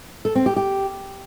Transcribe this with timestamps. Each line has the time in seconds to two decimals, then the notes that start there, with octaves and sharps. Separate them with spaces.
0.25 A4
0.35 C4
0.46 G4
0.56 G4